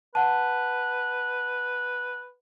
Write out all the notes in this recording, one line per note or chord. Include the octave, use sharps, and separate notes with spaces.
B4 F#5 A5